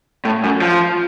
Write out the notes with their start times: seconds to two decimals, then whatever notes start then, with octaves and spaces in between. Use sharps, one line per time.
0.25 A2
0.44 F#2
0.61 F3